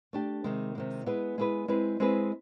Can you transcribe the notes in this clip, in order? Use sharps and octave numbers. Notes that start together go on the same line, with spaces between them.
A3 D4 G4
C3 D#3 G#3
C3 D#3 G#3
G#3 B3 E4 G#4 B4
G#3 B3 E4 G#4 B4
G#3 C4 E4 G#4 B4
G#3 C4 E4 G#4 B4